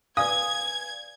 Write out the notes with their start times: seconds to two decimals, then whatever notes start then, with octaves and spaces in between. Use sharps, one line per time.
0.17 B4 D5 F5 G#5 D#6 G#6